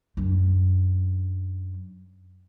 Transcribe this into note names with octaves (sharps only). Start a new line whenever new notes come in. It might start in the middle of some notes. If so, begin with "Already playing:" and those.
F#2 D4